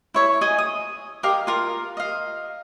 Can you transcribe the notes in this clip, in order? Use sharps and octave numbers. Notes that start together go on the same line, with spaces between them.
E4 C#5 E5
G#4 D#5 G#5
D#6
G4 A#4 D#5 F5
F4 A#4
D#5 F5